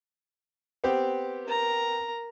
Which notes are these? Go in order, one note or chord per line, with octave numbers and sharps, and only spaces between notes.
B3 C4 G4
A#4 A#5